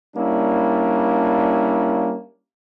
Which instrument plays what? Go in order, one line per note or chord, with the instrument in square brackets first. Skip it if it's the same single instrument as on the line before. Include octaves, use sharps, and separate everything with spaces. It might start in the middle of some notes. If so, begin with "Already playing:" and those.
[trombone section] G3 A#3 C#4 D4 E4